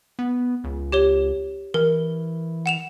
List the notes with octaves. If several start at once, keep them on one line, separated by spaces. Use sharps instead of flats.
B3
C#2
G4 C#5 G7
E3 A#4
F#5 E7 F7